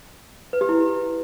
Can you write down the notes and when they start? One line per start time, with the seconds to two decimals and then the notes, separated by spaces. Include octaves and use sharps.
0.53 B4
0.61 G4
0.69 E4